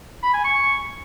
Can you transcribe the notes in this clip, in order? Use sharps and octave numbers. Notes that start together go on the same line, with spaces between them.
B5
G#5
C#6